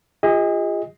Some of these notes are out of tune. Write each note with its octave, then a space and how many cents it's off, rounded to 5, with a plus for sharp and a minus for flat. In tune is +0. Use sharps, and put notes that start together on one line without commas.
F4 +0 G#4 -40 D#5 +20